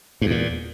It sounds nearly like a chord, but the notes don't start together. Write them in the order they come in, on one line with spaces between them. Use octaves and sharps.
G2 E2 A#2